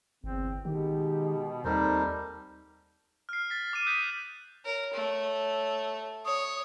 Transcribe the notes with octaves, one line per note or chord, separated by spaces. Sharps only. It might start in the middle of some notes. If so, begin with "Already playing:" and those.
G1 E2 C4
B2 D#3 G#3 D#4 G4
D#2 G3 C4 D#4 A4 A#4 C5
F6 C7
A6 B6
D6 F6 D#7
D#6 F#6 G6 B6
A#4 C#5
A3
C#5 D#6